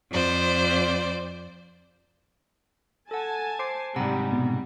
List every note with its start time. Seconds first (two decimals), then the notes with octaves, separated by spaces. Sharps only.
0.12 F2 C5 D5
3.11 A4 F#5 G#5 A5
3.59 C5 C6 D6 C7
3.96 G#2 C3 G3 F#5 A#5 B5
4.33 B2